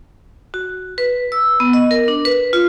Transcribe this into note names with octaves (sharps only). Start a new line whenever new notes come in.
F#4
B4
E6
B3
D#5
A#4
D4
B4
F4